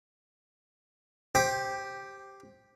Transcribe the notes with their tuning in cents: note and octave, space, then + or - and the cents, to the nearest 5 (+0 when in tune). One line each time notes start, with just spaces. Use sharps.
G4 +0 C5 +15